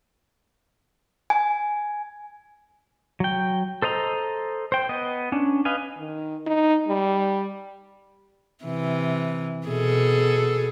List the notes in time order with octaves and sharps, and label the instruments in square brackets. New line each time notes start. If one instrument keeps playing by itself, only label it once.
[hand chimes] G#5
[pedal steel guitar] F#3 G5
A4 C5 D#5 A#5
C5 G5
B3 D#5
C#4 D4
B4 D#5 F5 G#5
[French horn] D#3
D#4
G3
[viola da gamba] C3 E3
B2 G#4 A4